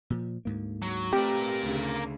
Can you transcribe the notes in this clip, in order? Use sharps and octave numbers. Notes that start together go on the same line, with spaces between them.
A#2 F3
D2 G#2 A#3
F#3
A3 C4 G4 A#4 B4 D5
D2 C#3